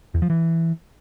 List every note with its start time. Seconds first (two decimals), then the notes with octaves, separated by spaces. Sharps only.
0.14 E2
0.22 F3
0.30 E3